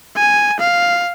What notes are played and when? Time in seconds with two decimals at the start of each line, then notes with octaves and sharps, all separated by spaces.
0.16 G#5
0.59 F5